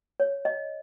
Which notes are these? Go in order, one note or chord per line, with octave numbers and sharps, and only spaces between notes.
C#5
D#5